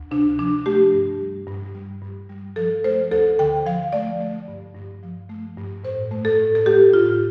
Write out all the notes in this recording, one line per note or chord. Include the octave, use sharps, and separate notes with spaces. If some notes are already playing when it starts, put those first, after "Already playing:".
Already playing: D2
C3 D4
F3 D4
A3 G4
G2
G3
G2
G3
G2
G3
F3 A4
A3 C5
D2 A4
D3 G5
F3 F5
A3 D5
A3
G2
G2
F3
A3
G2
A2 C5
A3
A4
A2
A4
A3 G4
A2 F4